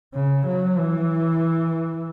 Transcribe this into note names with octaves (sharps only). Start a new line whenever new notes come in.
C#3
F#3
E3